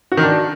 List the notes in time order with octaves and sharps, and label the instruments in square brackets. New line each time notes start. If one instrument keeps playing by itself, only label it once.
[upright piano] F#4
D#3
D4